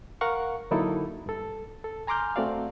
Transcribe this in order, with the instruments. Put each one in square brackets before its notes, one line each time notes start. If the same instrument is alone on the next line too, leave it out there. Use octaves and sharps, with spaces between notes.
[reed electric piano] A#4 F5 F#5 C#6
D3 F#3 A#3 D#4 E4 A4
G2 A4
A4
G#5 A#5 C6 D6 F6 G6
A3 C4 F#4 D5 F5